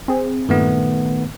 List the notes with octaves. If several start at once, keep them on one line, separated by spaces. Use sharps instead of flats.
C4 G#4
G2 A#2 D#3 A3 B3